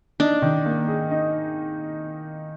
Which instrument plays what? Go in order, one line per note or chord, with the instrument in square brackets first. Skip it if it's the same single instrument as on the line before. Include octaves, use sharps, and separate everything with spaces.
[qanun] D4 [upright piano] D#4
[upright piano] D#3
A#3
G#4
D#4